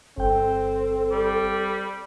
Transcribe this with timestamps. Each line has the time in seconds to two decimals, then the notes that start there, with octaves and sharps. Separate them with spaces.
0.18 G1 C4 A4 G5
1.11 G3